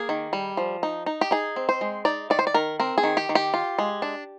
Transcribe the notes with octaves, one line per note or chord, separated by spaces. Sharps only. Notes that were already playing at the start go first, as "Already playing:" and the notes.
Already playing: A#3 G#4
D#3
G3
F3
D#4
D#4
G4
D#4 G#4
C4
C5
G#3
D#4 D5
D#3 D5
C5
D5
D#3 A#4
C4 A#4
G#4
D#3
G4
D#3
G4
F4
G#3
D4